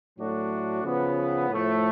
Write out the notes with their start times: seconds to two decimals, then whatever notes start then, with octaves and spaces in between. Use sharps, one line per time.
0.18 A2 F#3 A3 D4 F#4
0.84 C#3 F3 B3
1.49 A2 F3 A3